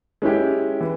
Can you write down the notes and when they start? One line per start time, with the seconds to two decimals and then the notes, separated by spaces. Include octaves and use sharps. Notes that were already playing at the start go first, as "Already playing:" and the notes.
0.22 G#3 C#4 E4 G4
0.81 E3